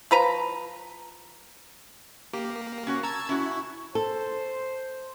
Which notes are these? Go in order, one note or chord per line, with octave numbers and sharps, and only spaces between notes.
F3 B4 A#5
A#3 G4
C#4 F#4 C#5
A5 A#5 E6 G#6
C#4 E4 F#4
A4 C5